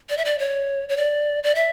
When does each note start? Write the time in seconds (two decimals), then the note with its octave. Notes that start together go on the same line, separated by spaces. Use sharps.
0.10 D5
0.17 E5
0.25 D5
0.39 C#5
0.89 C#5
0.97 D5
1.44 D5
1.55 E5